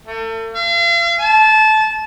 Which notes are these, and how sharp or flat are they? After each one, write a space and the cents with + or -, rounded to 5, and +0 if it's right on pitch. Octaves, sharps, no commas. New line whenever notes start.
A3 +35
F5 -40
A5 -20